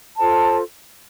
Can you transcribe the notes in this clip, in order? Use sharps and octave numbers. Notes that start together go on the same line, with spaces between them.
F4 A4 C5 A5